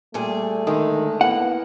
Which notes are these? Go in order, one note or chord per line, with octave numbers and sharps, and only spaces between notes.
A#2 G3 A3 G#4
D3 D#3 G#3
A2 A#3 B3 F#5